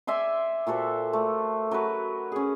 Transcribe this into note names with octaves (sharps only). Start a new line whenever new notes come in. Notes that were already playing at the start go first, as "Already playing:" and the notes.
D5 E5 G#5 C6
A#2 F#4 A4 C5
A3
F#3 A#4 B4
C#4 G#4